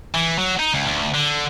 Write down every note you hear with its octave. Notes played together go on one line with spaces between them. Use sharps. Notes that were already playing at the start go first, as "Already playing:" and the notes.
E3
F#3
D#4
C#2
D2
D3